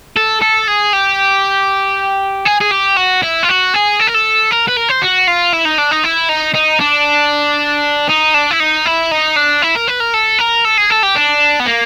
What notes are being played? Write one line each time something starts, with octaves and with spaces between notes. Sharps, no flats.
A4
A4
G#4
G4
G#4
G#4
G4
F#4
E4
F4
F#4
G#4
A4
A#4
A4
A#4
B4
A#4
C5
F#4
F4
E4
D#4
D4
D#4
E4
D#4
D#4
D4
D#4
D4
E4
D#4
E4
D#4
D4
E4
A#4
B4
A#4
A4
A#4
A4
G#4
A4
G4
D4
B3
A#3